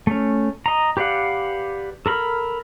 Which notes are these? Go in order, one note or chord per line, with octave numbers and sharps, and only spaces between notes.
A3 C#4
D#5 A#5
G4 B4 D5 F5 F#5
A4 A#4 B5 F6